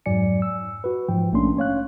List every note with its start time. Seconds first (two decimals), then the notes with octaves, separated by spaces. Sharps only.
0.06 F2 G#2 F#3 D5 G#5 C#7
0.42 E6
0.84 F#4 B4
1.08 G#2 F3 G5
1.32 A#1 A3 A#3 C#4 D4 C6
1.57 C#4 C#5 F5 F#6